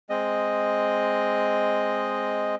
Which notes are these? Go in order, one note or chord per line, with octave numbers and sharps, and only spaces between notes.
G#3 C4 D#5